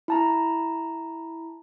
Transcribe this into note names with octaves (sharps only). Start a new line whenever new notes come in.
E4 A5 A#5